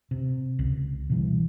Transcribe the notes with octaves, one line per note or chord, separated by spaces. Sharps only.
C3
C#2
B2 E3 G3